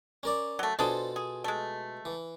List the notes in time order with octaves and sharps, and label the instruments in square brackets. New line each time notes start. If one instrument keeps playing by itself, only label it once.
[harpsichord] C#4 A#4 D5
[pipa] F#3 A3
[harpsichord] B2 F4 A4 [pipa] D4 G#4 C5
[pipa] G#4
G#3 A3
[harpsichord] E3